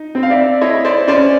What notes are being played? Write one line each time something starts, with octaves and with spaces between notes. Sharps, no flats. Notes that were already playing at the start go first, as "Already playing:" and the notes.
Already playing: D#4
C4
F5
D5 E5
E4 C#5 D#5
C5 D5
C#4 C5 D5